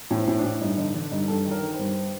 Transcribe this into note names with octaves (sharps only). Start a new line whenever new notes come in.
A2
C5
A2
D4
A2
G2 D#4
D3 D#4
D3 D4
G2 D#4
G2 A4
D#3
A#4
D#3
C5
G2